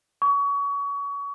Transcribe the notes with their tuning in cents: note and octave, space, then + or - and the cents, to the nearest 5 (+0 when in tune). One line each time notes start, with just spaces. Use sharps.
C#6 +30